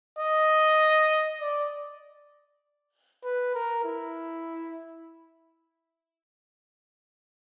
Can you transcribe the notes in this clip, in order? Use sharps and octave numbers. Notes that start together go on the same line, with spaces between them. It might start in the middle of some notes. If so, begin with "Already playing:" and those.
D#5
D5
B4
A#4
E4